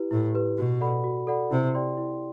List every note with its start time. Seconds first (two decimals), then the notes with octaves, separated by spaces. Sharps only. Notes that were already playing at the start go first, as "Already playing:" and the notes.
Already playing: E4 G4 B4
0.11 A2 E4
0.35 G4 B4
0.58 B2 F#4
0.81 A4 D5 F#5 B5
1.04 F#4
1.27 A4 D5 F#5 B5
1.51 C3 E4
1.75 G4 D5 G5 C6
1.97 E4